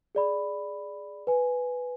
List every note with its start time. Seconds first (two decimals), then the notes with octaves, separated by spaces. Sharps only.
0.15 G#4 D5 B5
1.27 B4 G#5